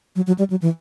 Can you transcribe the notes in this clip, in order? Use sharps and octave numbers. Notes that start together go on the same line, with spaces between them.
F#3
F#3
G3
F#3
E3